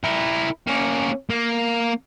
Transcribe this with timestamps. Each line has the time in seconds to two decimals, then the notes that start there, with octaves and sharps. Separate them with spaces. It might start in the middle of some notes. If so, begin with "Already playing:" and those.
0.04 E4 A#4
0.67 A#3 C#4
1.30 A#3